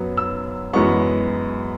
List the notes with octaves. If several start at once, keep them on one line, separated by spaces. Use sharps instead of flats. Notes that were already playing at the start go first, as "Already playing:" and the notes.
Already playing: F#2 F#3 B3
E6
F#2 E3 G#3 B3 C#6